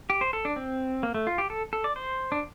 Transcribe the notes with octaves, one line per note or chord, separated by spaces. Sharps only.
G4
C5
A4
D4
C4
A#3
A3
F4
G4
A4
A4
D5
C5
D4